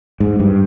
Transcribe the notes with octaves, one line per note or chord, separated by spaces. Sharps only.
G#2
G2